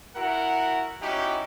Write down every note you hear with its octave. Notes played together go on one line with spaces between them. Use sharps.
E4 F#4 A#4 F#5
G3 C#4 D#4 E4 F#4 G4